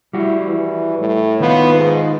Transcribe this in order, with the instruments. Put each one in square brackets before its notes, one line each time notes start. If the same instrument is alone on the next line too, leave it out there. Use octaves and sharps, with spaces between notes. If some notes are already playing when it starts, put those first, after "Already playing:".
[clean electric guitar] G3 F#4 [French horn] E4
[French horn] E3
A2
[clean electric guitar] D#3 D#4 F4 [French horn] B3
[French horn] G#2